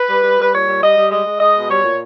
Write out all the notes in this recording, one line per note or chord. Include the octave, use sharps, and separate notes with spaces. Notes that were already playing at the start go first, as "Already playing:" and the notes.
Already playing: B4
G3
G3
G3 B4
A#2 C#5
G3
G3 D#5
G3
G#3 D#5
G#3
G#3 D#5
B2
G3 C#5
A#2